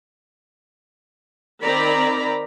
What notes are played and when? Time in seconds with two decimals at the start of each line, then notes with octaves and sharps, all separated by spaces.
1.63 D#3 C4 D5 A#5 B5